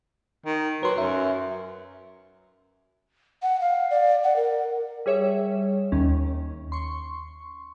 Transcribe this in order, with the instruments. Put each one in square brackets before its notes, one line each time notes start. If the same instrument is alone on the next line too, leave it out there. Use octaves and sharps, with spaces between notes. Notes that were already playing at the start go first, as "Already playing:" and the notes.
[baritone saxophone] D#3
[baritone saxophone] F#3 [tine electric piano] B4 C6
[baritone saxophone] F#2 [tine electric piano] E5
[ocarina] F#5
F5
D5
F#5
A#4
[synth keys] G3 G#4 C#5 E5
D#2 D#3 C#4
C6 C#6